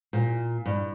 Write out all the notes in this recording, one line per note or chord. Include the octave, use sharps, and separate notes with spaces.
A#2
G2